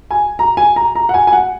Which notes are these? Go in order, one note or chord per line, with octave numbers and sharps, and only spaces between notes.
G#5
A#5
G#5
A#5
A#5
F#5
G#5
G#5
F#5